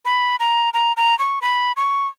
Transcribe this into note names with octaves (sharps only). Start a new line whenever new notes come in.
B5
A#5
A#5
A#5
C#6
B5
C#6